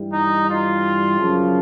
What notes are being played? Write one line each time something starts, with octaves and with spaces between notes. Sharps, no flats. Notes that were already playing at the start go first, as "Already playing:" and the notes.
Already playing: G2 E3 G3
D#4
F4
F#2 C#3 F3